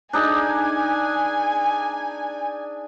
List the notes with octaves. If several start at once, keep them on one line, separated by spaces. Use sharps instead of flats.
D4 D#4 G#4 G#5